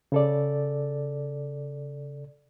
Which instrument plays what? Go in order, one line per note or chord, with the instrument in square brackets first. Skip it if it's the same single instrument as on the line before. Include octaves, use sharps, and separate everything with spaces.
[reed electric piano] C#3 A4 D5